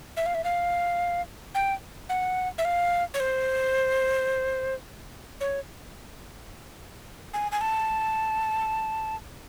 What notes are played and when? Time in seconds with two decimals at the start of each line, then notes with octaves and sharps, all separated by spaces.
0.17 E5
0.26 F5
0.35 E5
0.44 F5
1.55 G5
2.09 F#5
2.58 E5
2.65 F5
3.14 C#5
3.20 C5
5.41 C#5
7.34 G#5
7.52 G#5
7.61 A5